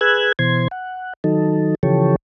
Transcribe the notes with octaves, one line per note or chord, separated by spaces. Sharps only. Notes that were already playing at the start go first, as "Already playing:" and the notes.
G#4 B4 E6 F#6 G#6
B2 E3 C5 C6 G#6
F#5
D#3 F#3 D#4 A4
C#3 E3 F3 G4 A4 C#5